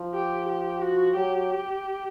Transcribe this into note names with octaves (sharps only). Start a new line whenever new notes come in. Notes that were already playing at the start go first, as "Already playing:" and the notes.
Already playing: F3
G4
G4
F#4
F#3 G4